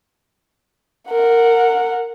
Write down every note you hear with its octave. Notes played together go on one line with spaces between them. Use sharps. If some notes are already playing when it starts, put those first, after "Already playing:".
A#4 F#5